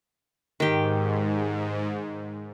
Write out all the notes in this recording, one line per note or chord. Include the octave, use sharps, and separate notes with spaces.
G#2 D#3 G4